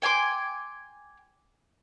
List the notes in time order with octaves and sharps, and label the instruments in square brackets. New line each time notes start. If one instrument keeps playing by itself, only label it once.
[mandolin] G5 G#5 C6 D6